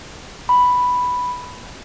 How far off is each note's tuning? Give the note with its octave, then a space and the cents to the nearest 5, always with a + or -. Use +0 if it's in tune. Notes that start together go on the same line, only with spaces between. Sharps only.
B5 +0